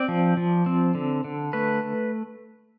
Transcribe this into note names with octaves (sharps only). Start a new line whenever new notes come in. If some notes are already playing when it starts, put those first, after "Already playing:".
Already playing: C4 D5
F3
F3
C4
D3
D3
A3 B4